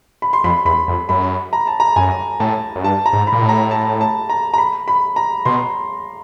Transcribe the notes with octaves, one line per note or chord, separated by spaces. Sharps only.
B5
C6
F2 B5
E2 B5
F2
F#2 B5
A#5
A5
A#5
F#2 G#5
A2 A5
F#2
G2 A5
A#5
G#2
B5
A#2
A2
A#5
A5
A5
A#5
A#5
B5
B5
A#5
B2 C6